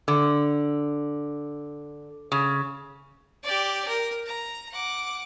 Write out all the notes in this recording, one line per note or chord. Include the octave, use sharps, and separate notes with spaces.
D3
C#3
G4 D5
A#4
A#5
F#5 D6